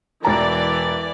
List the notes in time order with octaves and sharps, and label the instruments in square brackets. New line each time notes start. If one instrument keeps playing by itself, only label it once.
[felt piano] E1 A#5 [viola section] E3 D5